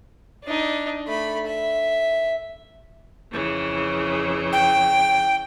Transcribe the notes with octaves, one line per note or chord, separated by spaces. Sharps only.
D4 D#4
A3 B5
E5
F2 C#3 E3
G5